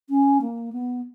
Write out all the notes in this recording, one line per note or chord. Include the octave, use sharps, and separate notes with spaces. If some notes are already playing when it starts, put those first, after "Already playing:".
C#4
A#3
B3